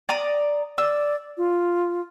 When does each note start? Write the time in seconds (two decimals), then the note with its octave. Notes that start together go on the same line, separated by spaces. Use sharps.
0.09 D5 A#5 D#6
0.78 D5 E6
1.37 F4